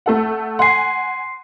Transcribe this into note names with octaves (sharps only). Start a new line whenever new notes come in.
A3 A4 F#5
F#5 G#5 C6 C7